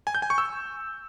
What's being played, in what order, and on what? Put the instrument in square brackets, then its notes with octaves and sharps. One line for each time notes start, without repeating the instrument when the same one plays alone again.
[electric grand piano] G#5
G6
G#5
C#6
E6